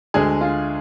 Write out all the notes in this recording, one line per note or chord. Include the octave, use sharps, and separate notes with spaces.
D2 D3 G#3 G#4
F4